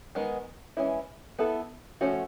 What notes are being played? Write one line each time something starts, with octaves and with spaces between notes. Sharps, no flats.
D#3 G#3 B3 D#4
E3 G#3 C#4 E4
B3 E4 A4
F3 A3 C#4 F#4